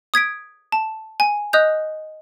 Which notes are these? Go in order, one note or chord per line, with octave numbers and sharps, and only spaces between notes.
D#6 G#6 B6 D7
A5
G#5
D#5 D#6 F#6 G6 F7